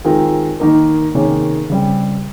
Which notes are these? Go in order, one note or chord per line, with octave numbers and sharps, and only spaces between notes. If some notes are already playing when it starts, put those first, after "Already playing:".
D#3 G#3 C4 F4 A#4
D#3 A#3 D#4 A#4
C3 D#3 A#3 C#4 G#4
C#3 G3 C4